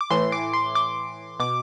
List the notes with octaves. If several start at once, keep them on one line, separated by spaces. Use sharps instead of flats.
D6
A2 E3 C6
D6
C6
D6
B2 D6